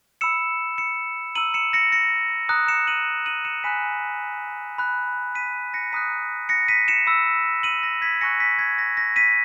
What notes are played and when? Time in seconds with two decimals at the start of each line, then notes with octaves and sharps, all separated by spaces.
0.21 B5 E6 C#7 E7
0.78 C#7 E7
1.35 A#5 E6 D#7 F#7
1.54 C#7 E7
1.73 A#6 C#7
1.92 A#6 C#7
2.49 A#5 D#6 F#6
2.68 C#7 E7
2.87 D#7 F#7
3.26 D#7 F#7
3.45 C#7 E7
3.64 G#5 B5 F#6 B6 D#7
4.78 B5 F#6
5.35 B6 D#7
5.74 A#6 C#7
5.92 A#5 D#6 F#6 B6 D#7
6.49 A#6 C#7
6.68 B6 D#7
6.88 C#7 E7
7.07 B5 E6
7.63 D#7 F#7
7.83 A#6
8.02 G#6 B6
8.21 G#5 C#6 F#6 A#6 C#7
8.40 B6 D#7
8.59 G#6 B6
8.78 A#6
8.97 A#6
9.16 B6 D#7